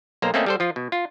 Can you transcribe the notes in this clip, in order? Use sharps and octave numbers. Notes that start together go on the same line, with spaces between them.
B1 A#3 C5 A#5
A3 A#3 C4 C#4 A4 D#5
G3 A4 C5
F3 F4
B2
F4